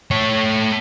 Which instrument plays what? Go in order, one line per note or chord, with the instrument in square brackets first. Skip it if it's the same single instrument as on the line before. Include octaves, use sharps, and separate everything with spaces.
[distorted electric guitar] A3 C#5